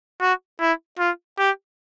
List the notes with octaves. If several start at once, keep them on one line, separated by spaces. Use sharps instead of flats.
F#4
E4
F4
G4